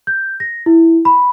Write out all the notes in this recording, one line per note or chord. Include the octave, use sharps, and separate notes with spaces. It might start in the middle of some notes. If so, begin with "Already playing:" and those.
G6
A#6
E4
B5